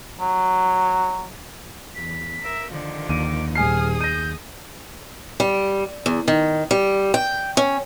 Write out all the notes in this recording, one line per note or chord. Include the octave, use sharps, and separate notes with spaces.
F#3
E2 B6
A#4 E5
D3 D#3 F3
D#2 D6 D#7
D#1 G#4 G#5 D#6 F6 C7
G6 A#6 D#7
G3
E2
D#3
G3
G5
C#4